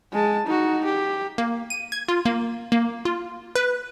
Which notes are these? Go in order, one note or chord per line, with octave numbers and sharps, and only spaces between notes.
G#3 A5
D#4 F#4
G4
A#3
D#7
G#6
F4
A#3
A#3
F4
B4